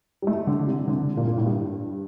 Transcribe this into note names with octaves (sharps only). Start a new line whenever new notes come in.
G3
A3
D3
C3
D3
A#2
A#2
A2
G2